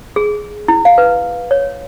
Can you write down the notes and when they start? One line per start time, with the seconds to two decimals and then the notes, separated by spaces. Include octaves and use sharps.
0.16 G#4
0.68 E4
0.85 F5
0.98 B4
1.51 C#5